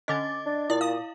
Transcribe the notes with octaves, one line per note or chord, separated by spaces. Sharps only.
D3 C#4 D#5 D6 A6
D4
A#2 E4 D5
F5 D#6